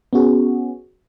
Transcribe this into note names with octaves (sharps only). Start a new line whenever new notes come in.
B3 C#4 F#4 G#4